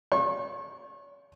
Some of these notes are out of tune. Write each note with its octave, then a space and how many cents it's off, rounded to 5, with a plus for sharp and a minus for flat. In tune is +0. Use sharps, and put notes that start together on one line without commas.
C#5 +45 C#6 -35